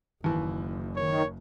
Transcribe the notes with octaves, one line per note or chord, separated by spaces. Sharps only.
F#1 D#2 E3
D#3 C#5